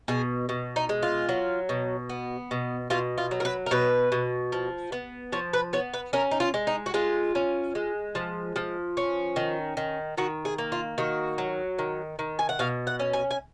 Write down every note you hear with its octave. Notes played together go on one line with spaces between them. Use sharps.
B2 G#4
B2
D#4
G#3
F4
F#3
B2
B3
B2
B2 F4
F4
F#3
A#4
B4
A#4
B2 B4
B2
F3
B3
F3 C#5
B4
B3 C#5
B4
C#4 A#4
D#4
F4
G#3
D#4
F#4
G#3 F4
C#4
G#3
F3
F3
C#4
D#3
D#3
D#3 F#4
G#4
A#3
F4
D#3 F#4
F#3
D#3
D#3
G#5
F#5
B2 F5
F#5
C#4
G#5
G#5